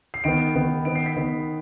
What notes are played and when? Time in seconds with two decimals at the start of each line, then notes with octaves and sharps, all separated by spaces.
0.14 C7
0.24 D#3 B3 D7
0.55 D#3 B3
0.85 D#3 B3 D7
0.95 C7
1.06 B6
1.16 D#3 B3